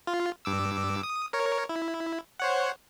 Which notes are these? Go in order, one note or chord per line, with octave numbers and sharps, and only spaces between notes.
F4
G2 D6 E6
D#6
A#4 C#5
E4
C5 C#5 F#5